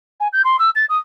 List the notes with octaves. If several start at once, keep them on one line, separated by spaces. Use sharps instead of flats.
G#5
G6
C6
E6
A6
D#6